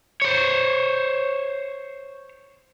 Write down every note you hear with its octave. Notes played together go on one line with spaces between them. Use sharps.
C5 C#5